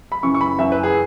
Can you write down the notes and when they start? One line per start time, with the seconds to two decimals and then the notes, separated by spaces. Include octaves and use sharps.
0.12 B5
0.23 F#2 C#3 E3 C#6
0.34 C#6
0.41 B5
0.59 F#2 E3 E5
0.72 B4
0.83 G#4